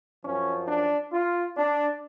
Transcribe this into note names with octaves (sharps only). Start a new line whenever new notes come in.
F#2 F3 C#4
D4
F4
D4